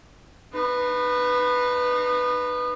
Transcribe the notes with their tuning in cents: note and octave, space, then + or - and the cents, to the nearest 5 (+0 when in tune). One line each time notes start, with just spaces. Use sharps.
D#4 -35 B4 +0